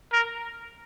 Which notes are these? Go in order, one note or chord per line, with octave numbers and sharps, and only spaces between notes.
A#4